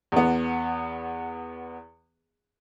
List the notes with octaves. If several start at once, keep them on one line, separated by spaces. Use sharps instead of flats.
E2 B3